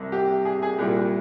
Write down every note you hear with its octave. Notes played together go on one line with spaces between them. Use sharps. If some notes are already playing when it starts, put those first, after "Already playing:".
Already playing: C2 C3 G3
G4
G#4
G#4
C2 A#2 G3 G4